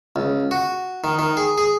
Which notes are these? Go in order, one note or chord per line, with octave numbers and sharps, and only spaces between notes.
C#2
F#4
D#3
D#3
G#4
G#4